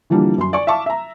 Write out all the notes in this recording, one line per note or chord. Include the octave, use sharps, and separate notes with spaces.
D3 E3 F3 G3 A#3 D4
F#2 C6
D5 G#5 C#6
E5 F5 A5 C#6 D6
E5 A#5